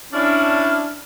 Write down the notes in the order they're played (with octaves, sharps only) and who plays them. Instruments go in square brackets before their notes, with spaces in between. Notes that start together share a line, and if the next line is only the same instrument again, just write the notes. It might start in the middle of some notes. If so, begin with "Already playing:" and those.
[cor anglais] C#4 [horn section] D4 E4 [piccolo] F6